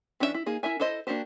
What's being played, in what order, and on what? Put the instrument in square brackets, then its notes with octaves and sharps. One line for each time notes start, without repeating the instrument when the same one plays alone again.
[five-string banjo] E3 C#4 D4 G#4 E5
E4
A#3 D#4 G#4
E4 A#4 E5 G#5
E4 A4 C5 D#5
A#3 D4 F#4 G4 C5